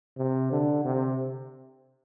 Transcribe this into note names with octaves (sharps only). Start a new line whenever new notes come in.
C3
D3
C3